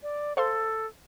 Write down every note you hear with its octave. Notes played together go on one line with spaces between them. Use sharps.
D5
A4 C5 F5 C6